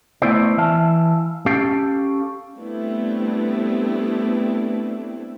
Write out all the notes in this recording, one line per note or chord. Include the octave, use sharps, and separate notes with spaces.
A3 B3 E4 C5 D5
E3 E5 F5 A5
C#4 G4 A4 F5
G3 A3 B3 C4 D4 E4